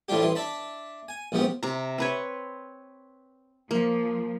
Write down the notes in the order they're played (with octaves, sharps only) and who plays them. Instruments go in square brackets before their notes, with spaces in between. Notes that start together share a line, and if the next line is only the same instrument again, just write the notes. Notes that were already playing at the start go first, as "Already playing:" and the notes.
[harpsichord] A2 E3 F3 G3 D4 G4
A1 E3 C6
D4 E5 A5 B5
G#5
A#1 G#2 F3 B3 G4
[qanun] C3 A#5
C4 B4 C#5
[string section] F3 [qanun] A#3